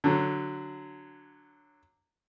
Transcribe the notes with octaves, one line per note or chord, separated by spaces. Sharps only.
D3 F#3